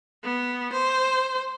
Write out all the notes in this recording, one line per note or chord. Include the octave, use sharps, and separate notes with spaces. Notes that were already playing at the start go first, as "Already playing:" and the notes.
B3
C5